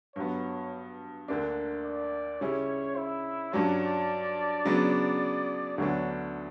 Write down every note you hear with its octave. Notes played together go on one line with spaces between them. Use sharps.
G2 F#3 B3 C#5
D2 D3 A#3 D4
D5
C#3 G3 C#4 E4 C#5
E4
G2 F#3 C#4 D5
C#3 F#3 B3 D4
D2 D3 F#3 B3 D4 C#5